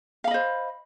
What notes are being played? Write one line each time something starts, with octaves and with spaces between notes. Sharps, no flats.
C5 D#5 F5 B5